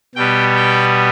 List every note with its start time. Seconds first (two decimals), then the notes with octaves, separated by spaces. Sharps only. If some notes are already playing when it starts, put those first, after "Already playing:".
0.15 B2 G3 B3 G5
0.56 G5